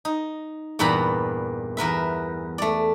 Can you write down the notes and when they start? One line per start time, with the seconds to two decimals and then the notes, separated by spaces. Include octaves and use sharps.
0.05 D#4
0.79 E2 G2 A#2 B4 A#5 B5
1.77 E2 A#4 B4 E5
2.58 A3 D5